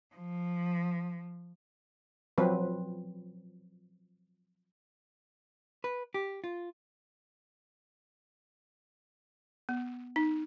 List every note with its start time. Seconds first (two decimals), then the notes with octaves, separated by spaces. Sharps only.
0.15 F3
2.38 F3 F#3 C4 B4
5.84 B4
6.14 G4
6.44 F4
9.69 B3
10.16 D#4